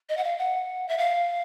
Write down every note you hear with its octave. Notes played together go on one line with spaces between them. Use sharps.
D#5
F#5
F5
F#5
E5
F5